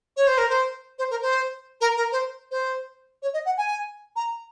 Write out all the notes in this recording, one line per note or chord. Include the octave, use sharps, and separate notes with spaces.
C#5
C5
A#4
C5
C5
A#4
C5
A#4
A#4
C5
C5
C#5
D#5
F#5
G#5
A#5